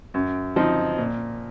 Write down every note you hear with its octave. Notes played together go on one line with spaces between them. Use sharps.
F#2
F3 C4 D#4
A#2